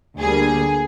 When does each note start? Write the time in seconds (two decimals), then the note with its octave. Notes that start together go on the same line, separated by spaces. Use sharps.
0.20 D2 D3 G3 A#3 G#4